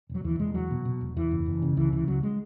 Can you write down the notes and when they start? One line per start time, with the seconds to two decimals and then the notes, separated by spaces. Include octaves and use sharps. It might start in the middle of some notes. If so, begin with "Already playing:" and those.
0.09 E1
0.15 F#3
0.24 D#2 E3
0.39 E1 G#3
0.54 E2 F#3
0.71 B2
0.85 B2
1.01 E1
1.16 E2 E3
1.31 F#1
1.46 F#1
1.62 C#3
1.77 C#2 E3
1.93 C#3 E3
2.08 C#2 F#3
2.23 G#3